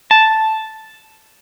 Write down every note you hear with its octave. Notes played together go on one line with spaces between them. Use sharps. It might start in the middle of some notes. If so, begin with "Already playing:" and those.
A5